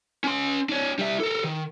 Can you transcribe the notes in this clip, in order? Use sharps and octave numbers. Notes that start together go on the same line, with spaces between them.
C#4 C6
D4 C#5
G3 E5
A4 A#4
D#3